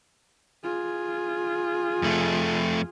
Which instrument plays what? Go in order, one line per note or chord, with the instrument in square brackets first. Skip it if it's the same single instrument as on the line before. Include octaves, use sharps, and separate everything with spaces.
[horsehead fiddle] F4 G#4
[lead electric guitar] F2 A3